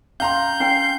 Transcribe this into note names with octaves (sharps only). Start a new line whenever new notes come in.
C#4 F5 A#5 C6 G6
C#4 B4 G#5 C7